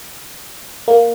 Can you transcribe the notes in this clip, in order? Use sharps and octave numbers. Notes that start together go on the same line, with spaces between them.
A#3